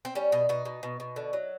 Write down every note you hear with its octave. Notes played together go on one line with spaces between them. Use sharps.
C4
G3 C#4
B2 D#4
B2 D#4
B2
B2
B2
D3
F#3